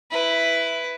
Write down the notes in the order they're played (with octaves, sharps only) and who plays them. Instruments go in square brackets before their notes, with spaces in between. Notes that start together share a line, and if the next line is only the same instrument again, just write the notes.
[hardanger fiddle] E4 B4